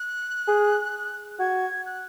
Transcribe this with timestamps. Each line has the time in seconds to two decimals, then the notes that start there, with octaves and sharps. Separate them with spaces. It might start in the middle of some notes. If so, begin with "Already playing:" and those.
Already playing: F#6
0.48 G#4
1.39 F#4 G#6
1.86 F#6